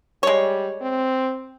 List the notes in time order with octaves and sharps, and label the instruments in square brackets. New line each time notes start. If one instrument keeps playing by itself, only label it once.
[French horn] G3 [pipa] G#3 C#5
[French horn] C4